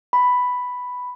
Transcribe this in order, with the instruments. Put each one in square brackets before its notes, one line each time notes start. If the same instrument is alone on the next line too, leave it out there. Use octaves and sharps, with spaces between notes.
[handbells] B5